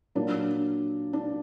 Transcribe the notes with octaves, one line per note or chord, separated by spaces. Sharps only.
A#2 F#3 A#3 D4
D4